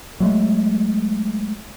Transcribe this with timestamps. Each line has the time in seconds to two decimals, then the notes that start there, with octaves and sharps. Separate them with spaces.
0.20 F#3 G#3 A3